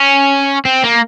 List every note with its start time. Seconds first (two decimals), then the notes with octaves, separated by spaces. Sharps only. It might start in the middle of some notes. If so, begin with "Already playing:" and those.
Already playing: C#4
0.65 C4
0.84 A#3